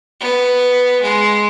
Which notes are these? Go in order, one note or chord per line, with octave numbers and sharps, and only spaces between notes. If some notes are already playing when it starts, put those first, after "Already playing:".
B3
G#3